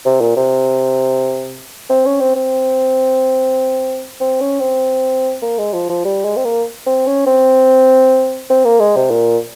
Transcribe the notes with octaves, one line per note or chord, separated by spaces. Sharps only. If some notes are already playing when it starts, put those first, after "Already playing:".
C3
A#2
C3
C4
C#4
C4
C4
C4
C#4
C4
A#3
G#3
F3
F3
G3
G#3
C4
A#3
C4
C#4
C4
C4
A#3
G#3
C3
A#2